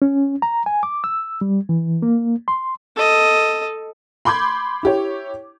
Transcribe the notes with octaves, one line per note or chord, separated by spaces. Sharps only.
C#4
A#5
G#5
D6
E6
G3
E3
A#3
C6
A4 D#5
B5 C6 D6 G6 G#6
E4 G4 C#5